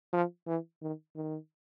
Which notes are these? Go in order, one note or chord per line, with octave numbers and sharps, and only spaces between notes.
F3
E3
D#3
D#3